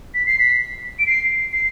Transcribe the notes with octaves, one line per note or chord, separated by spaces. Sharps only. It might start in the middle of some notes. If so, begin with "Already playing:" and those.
B6
C7
B6
D7
C7
C7